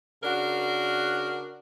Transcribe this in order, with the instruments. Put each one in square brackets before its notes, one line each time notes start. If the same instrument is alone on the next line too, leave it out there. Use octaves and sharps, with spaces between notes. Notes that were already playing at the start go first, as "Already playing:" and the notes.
[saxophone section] C#3 D4 F#4 A#4